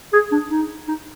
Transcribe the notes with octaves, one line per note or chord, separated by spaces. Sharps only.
G#4
D4
D#4
D#4